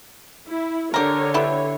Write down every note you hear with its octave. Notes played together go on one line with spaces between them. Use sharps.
E4
D3 G4 A#4 C#5
B3 E4 G4